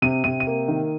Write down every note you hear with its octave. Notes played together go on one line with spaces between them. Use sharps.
C3 D#7
C3 D#7
D#7
A#3
D#3